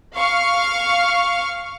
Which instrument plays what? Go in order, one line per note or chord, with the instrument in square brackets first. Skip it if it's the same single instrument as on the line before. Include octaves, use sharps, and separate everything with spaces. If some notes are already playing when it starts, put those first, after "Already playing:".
[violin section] F5 C#6 F6